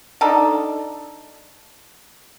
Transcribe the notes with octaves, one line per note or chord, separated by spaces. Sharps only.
D4 D#4 A4